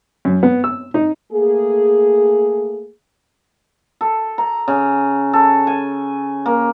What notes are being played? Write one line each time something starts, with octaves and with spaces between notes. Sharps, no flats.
F#2
B3
E6
D#4
A3 A#3 G#4
A4
A#5
C#3
A4
G#5
A#3